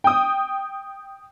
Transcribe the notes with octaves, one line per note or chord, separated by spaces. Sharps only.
G5 D#6